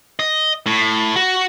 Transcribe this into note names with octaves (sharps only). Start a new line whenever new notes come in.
D#5
A2
F#4